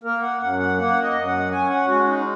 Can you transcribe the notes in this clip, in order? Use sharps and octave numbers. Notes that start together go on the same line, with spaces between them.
A#3 A#4
F#5
F#2 F#5
F#5
A#3 F#5
D#5
F#2
F#5
C#4 G#5
F#5
G#3 F#4
D#4